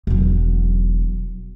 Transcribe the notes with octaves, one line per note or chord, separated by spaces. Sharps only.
E1 F#3